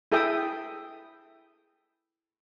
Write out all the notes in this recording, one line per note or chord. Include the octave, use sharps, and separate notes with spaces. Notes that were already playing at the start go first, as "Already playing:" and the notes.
E4 G#4 A4 E5 G5 D#6